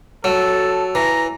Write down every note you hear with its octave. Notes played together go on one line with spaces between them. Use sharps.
F#3 A4
E3 A#5